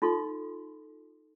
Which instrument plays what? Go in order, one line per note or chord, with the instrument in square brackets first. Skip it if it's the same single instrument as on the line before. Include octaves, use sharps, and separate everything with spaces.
[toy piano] D#4 F4 A4 C6